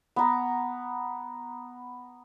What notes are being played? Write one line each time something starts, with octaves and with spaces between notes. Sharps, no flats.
B3 A#5